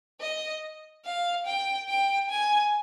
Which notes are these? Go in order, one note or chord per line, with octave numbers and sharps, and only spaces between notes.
D#5
F5
G5
G5
G#5